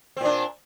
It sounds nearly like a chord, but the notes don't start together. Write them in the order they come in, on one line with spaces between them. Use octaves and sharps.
C4 A#2 D4